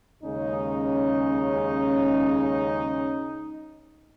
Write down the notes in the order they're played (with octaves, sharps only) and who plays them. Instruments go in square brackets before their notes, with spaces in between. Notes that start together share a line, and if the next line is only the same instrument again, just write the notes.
[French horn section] D#2 C#3 G#3 C#4 D#4